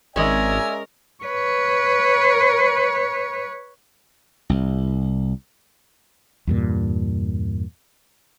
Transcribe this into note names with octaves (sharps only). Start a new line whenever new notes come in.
G#1 G#3 C#4 A#4 D5 E5 G#5
B4 C#5
C2
E2 G2 A#2